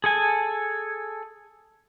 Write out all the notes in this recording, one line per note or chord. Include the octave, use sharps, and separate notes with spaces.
G#4 A4 G#5